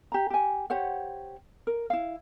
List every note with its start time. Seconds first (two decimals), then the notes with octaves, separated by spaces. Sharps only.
0.12 G4 A#5
0.30 G4 G#5
0.70 G4 C5 C#5 F#5
1.67 A#4
1.90 E4 F5